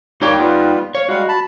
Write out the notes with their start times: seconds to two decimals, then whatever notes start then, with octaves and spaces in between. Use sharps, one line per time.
0.22 G3 A#3 D#4 G4 C#5 G5
0.39 G3 B3 F4
0.95 C#5 F5
1.09 G3 G#3 F#4 F5
1.29 A5 B5